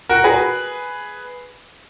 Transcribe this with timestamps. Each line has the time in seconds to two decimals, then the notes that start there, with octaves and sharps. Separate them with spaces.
0.09 F#4 A#4
0.24 G#4 B4